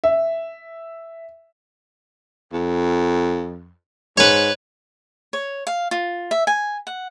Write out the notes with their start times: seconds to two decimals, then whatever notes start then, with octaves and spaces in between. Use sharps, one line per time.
0.04 E5
2.53 F2
4.17 G#2 B4 C#5
5.33 C#5
5.67 F5
5.91 F4
6.31 E5
6.47 G#5
6.87 F#5